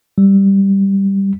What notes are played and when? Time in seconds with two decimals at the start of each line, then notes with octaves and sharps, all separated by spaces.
0.18 G3